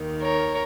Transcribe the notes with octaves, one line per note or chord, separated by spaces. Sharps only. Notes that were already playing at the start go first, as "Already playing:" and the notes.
Already playing: D#2 D#3
A#4 C#5